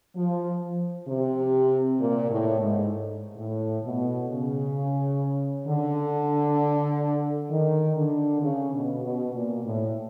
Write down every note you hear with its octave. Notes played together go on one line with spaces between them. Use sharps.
F3
C3
A#2
A2
G#2
A2
B2
C#3
D3
D#3
D3
C#3
B2
B2
A#2
A2